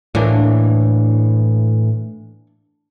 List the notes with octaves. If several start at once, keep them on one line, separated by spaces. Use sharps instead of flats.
A2 E3 A#3 D4